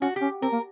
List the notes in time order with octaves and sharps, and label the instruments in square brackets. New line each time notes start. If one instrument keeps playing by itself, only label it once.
[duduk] C#4 [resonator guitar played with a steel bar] F#4
[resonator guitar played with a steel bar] G4
[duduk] C#4
[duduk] C4 [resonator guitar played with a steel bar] A#4
[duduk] A#3